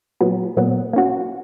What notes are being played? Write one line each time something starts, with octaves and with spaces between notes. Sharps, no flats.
A#2 F#3 B3
A#2 F#3 B3
A#3 C#4 F#4